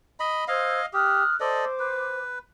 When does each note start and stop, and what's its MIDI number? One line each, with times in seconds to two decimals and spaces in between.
0.20 0.45 75
0.20 0.45 83
0.48 0.80 72
0.48 0.86 75
0.48 0.86 77
0.48 0.80 88
0.48 0.80 92
0.93 1.24 67
0.93 1.35 87
0.93 1.35 89
0.93 1.35 90
1.40 1.65 69
1.40 2.20 72
1.40 1.65 74
1.40 1.65 75
1.40 2.20 86
1.79 2.39 71